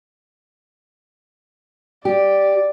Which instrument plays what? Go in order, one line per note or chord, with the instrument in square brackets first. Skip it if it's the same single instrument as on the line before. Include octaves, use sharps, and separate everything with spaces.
[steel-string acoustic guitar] G4 [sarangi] D5